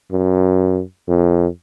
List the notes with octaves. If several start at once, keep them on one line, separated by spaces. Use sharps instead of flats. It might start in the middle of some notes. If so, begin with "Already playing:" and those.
F#2
F2